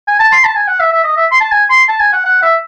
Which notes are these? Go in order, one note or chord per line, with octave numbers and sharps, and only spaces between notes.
G#5
A5
C6
A5
G#5
F#5
E5
E5
D#5
E5
C6
A5
G#5
C6
A5
G#5
F#5
F#5
E5